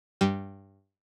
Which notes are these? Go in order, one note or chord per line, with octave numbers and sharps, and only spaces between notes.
G2 G3